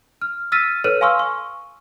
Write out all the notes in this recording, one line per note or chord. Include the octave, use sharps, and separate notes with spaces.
F6
E6 F6 A6 B6 D#7
A4 B4 C#5 F6 D#7
F5 G#5 C6 C#6 E6 F6
C#6